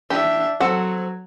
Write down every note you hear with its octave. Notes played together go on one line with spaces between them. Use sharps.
E3 D4 G4 E5
F#3 C4 A4 F#5